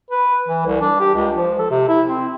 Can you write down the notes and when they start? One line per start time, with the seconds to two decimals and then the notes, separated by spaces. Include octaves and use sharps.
0.11 B4
0.48 E3
0.66 C2
0.81 D4
1.00 G4
1.15 C#2
1.37 F3
1.59 A4
1.71 C3
1.88 E4
2.09 C4